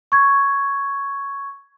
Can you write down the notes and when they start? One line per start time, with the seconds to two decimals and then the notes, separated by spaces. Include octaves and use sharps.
0.12 C#6 G#6